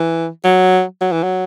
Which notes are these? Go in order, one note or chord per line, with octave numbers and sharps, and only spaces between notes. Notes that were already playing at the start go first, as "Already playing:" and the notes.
Already playing: E3
F#3
F#3
E3
F#3